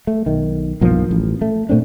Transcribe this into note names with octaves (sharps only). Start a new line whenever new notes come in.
A3
B1 D#3
B1 G2 F3 A#3
A1
A3
A#2 A3 C4 D4